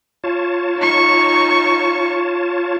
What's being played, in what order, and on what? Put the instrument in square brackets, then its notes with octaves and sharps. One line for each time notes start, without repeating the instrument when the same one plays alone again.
[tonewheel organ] F4 C#5 A5
[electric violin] D#4 C#6